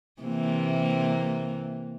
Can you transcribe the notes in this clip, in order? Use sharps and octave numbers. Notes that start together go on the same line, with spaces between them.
C3 E3 A#3